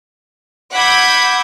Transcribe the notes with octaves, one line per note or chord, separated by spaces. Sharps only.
F#5 B5 D6 E6 G6 G#6